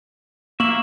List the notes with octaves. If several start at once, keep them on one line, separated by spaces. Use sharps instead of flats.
A#3 E5 C#6 F#7